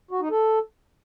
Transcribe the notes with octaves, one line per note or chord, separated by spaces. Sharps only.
F#4
D#4
A4